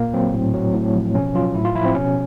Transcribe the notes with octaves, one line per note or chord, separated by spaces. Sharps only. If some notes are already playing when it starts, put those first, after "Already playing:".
Already playing: A#2 A#3
F#3 C4
A2
F#3
A2
F3
B2 C#4
F#3 F4
A2 E4
F4
F3 E4
C4
B2 C#4